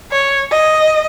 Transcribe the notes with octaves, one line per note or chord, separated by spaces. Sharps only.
C#5
D#5